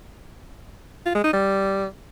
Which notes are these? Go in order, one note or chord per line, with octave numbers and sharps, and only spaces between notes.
F4
G#3
D#4
G3